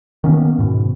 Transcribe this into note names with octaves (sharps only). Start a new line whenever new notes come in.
D#3 A#3 B3 C#4
G#2 B2